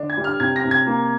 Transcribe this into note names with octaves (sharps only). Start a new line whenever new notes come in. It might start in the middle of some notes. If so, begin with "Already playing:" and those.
Already playing: D3 D4
G#6
G3
F6
C3 G#6
A#6
C3
G#6
A#3